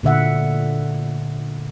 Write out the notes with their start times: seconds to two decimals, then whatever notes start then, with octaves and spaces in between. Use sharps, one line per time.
0.03 A#2 D3 E5 F#5